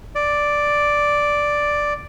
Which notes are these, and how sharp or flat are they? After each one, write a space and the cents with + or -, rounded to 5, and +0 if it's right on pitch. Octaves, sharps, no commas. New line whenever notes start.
D5 +0